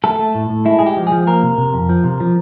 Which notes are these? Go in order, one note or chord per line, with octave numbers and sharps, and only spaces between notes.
A3 A4
A3
A2
A2
G#3 E4
G#3 G#4
G4
F3
G#4
F3
A#3 A#4
C3
C3
F2
F3
C3
F3